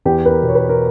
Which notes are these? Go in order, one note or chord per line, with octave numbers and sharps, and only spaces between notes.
E2 G4
B4
A#4
B2
C#5
B4
A#4